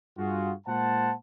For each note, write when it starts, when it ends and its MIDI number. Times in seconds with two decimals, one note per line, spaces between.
0.18 0.52 43
0.18 0.52 65
0.18 0.52 66
0.18 0.52 68
0.67 1.14 46
0.67 1.14 56
0.67 1.14 72
0.67 1.14 78
0.67 1.14 81